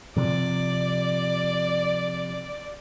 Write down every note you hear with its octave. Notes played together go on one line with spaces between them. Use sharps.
C3 F3 D5